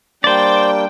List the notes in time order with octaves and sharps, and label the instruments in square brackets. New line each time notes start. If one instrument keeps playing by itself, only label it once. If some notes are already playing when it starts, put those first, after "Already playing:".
[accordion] G3 A#3 D4 [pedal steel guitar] C5 D5 [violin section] G5